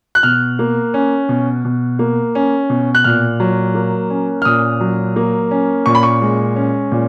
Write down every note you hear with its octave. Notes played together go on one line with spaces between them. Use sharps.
F#6
B2 F6
A#3
C#4
B2
B2
A#3
C#4
B2
F#6
A#2 F6
F#3
A#3
C#4
F6
A#2 D#6
F#3
A#3
C#4
A#2 C#6
B5
C#6
G#3
C#4
A#2